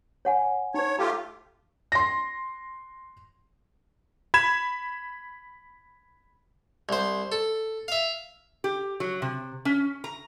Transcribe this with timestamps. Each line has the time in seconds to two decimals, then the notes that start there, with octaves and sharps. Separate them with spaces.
0.25 C#5 F#5 G#5
0.74 D#4 C5 C#5
0.99 A3 F4 G4 A#5
1.92 C6 A#6
4.34 B5 G#6 E7
6.89 C2 C5
7.32 A4
7.88 E5 F5
8.64 G4
9.00 F#3
9.22 C3
9.65 C#4
10.04 A#5